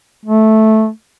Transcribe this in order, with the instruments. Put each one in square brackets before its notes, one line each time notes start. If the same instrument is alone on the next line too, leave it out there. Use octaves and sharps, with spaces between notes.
[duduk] A3